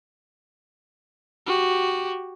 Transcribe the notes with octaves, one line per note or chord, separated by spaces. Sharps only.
F#4 G4